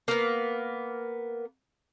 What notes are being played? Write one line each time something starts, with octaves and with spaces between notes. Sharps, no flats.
A#3 B3